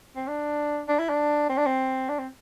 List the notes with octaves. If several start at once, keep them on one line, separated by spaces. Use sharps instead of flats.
C4
D4
D4
E4
D4
C4
D4
C4
D4
C4